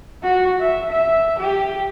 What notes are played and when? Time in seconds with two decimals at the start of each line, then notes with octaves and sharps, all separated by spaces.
0.23 F#4
0.60 E5
0.91 E5
1.39 G4